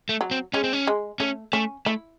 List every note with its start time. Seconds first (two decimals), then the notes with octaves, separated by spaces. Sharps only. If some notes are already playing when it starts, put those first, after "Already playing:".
0.09 A3
0.21 F#3
0.31 C4
0.54 G#3 C#4
0.64 C4
0.73 C#4
0.87 G#3
1.20 A3 C#4
1.53 A3 C#4
1.86 A3 E4